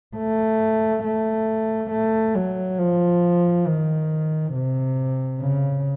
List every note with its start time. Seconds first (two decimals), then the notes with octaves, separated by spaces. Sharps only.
0.16 A3
1.04 A3
1.91 A3
2.35 F#3
2.79 F3
3.66 D#3
4.54 C3
5.41 C#3